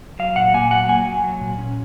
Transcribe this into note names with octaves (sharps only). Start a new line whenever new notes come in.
F#3 F5
A#2 F#5
A#3 G#5
F#3 F#5
A#3 G#5
F#3
F#3
A#2
C#4